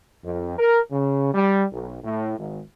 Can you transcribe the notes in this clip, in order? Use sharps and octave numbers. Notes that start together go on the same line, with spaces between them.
F2
A#4
C#3
G3
B1
A2
G#1